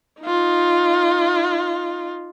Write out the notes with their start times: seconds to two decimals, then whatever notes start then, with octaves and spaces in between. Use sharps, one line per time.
0.22 D#4 F4